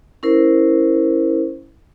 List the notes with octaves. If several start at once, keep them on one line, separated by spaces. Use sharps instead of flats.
C#4 E4 A#4 C5